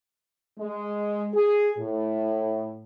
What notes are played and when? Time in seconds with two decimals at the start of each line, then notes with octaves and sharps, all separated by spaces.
0.59 G#3
1.34 G#4
1.79 A2